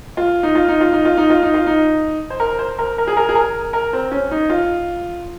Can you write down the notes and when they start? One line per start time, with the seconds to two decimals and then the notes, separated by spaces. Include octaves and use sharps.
0.17 F4
0.43 D#4
0.55 F4
0.68 D#4
0.81 F4
0.93 D#4
1.05 F4
1.17 D#4
1.30 F4
1.43 D#4
1.54 F4
1.67 D#4
2.30 C5
2.40 A#4
2.59 C5
2.79 A#4
2.98 A#4
3.07 G#4
3.17 A#4
3.29 G#4
3.35 A#4
3.73 A#4
3.93 C4
4.11 C#4
4.31 D#4
4.50 F4